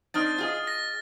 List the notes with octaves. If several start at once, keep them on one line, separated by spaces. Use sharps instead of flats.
C4 D4 D#4 F6 A6
F4 G#4 D#5
A#6